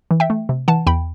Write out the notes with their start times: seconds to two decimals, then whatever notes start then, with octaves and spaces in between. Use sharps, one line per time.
0.11 E3
0.20 E5 G5
0.30 A3
0.49 C3
0.68 E3 F#5 A5
0.87 E2 G5 B5